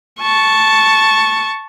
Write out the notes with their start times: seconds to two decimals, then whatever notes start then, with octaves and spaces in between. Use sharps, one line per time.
0.20 A5 C#6